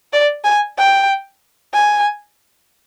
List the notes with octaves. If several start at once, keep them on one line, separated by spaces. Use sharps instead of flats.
D5
G#5
G5
G#5